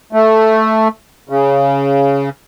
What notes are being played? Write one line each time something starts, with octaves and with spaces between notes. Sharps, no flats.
A3
C#3